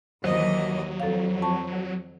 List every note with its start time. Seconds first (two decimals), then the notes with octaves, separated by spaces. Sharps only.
0.24 D#2 D#3 E3 F#3 C5 D#5
1.00 F2 A4 F5
1.42 A5 C#6